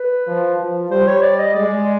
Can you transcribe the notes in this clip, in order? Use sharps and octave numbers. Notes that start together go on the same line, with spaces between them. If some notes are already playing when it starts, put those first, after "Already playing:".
Already playing: B4
F3
F3
G3 C5
C#5
D5
D#5
G#3 D5